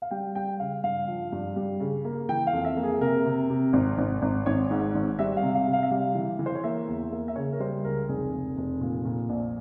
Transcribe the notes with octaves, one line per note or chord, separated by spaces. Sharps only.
F5
G3 G5
G3 G5
C#3 F5
G2 F5
F3
G2
G3
C#3
A#3
E3 G5
F5
F2
E5
A#3
G#4
C3 A#4
C3
C3
G#1
G#1
G#1
G#1 C#5
G#2
G#1
G3 E5
F5
C3
F5
C3
F5
E5
G3 F5
E3
E3
C5
C#5
A#3 E5
E2
A#3
E5
C#3 C#5
A#4
G3 C5
C#2 A#4
F1 G#4
F1
F1
A#2
A#2
A#1